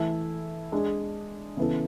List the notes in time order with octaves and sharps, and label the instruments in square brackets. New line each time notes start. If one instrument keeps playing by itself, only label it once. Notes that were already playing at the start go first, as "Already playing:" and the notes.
Already playing: [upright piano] E3 A3 E4 A4
G#3 D4 G#4
C#3 E3 B3 E4 A4